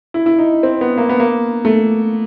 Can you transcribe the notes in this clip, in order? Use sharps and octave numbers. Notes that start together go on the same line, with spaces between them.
E4
E4
D#4
C4
B3
A#3
B3
A#3
A3